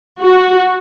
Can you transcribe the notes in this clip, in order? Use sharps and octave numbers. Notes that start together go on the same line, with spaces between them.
F#4